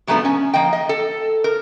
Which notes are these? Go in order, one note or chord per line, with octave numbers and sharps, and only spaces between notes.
A#2 F#3 G#3 A3 B3 D4
C#4 G#5
F3 A#3 D#5 G5
D#5
A4
A#4